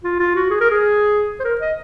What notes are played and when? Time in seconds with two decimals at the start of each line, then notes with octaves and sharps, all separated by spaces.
0.03 F4
0.20 F4
0.35 F#4
0.51 G#4
0.60 A#4
0.70 G#4
1.39 C5
1.44 A#4
1.61 D#5